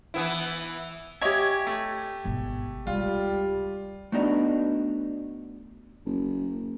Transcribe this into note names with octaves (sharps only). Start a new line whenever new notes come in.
E3 B3 E4
G4 C#5 D#5 E5 G#5
A3
G#1 B2
C#2 G3 F4
A3 B3 D4 D#4 F#4
F#1